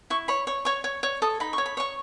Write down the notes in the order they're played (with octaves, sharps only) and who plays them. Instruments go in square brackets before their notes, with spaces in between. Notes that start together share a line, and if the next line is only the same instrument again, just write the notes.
[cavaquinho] E4 C#6
C#5 B5
C#5
C#5 C#6
C#5
C#5
A4 D#6
D#4 B5
C#6
C#5
B5
C#5 C#6